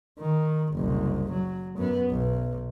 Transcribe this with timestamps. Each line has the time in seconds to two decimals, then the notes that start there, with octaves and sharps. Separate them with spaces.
0.19 D#3
0.74 F#1 C2
1.32 F#3
1.78 F#2 B3
2.10 B1